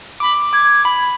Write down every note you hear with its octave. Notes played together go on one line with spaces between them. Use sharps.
B5 D6
D6 G#6
B5